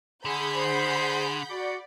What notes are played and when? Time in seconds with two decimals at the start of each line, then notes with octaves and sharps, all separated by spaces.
0.25 D3 G#4 F#5 B5 G6
0.54 C5
1.49 F#4 D5